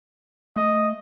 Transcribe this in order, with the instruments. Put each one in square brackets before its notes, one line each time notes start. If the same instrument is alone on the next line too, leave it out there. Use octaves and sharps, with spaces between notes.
[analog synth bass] A3 [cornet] D#5